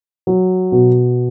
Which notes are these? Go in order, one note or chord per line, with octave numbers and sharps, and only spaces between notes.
F#3
B2